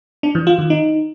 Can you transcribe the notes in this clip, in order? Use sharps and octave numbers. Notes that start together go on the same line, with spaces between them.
D4
E3
F4
D#3
D#4